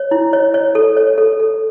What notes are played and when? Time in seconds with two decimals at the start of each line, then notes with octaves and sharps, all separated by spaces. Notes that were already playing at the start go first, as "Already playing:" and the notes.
Already playing: C#5
0.11 E4
0.33 C#5
0.54 C#5
0.75 A4
0.97 C#5
1.18 A4
1.40 A4